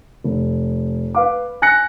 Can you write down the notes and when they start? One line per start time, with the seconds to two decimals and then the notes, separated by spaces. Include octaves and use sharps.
0.24 F1
1.15 B4 F5 D6
1.62 G#5 F#6 A#6 C#7